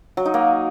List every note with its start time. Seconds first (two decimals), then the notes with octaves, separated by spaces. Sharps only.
0.17 F#3
0.26 D#4
0.34 A#3